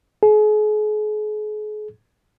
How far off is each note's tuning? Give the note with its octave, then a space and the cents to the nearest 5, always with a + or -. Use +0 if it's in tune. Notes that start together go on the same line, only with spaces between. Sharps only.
G#4 +40